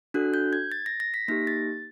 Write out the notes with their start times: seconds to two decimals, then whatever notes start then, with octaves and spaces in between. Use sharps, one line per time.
0.14 D4 F#4 A4 F#6
0.34 G6
0.53 G#6
0.72 A6
0.86 A#6
1.00 A#6
1.14 B6
1.28 A#3 D#4 G4 A#6
1.47 A6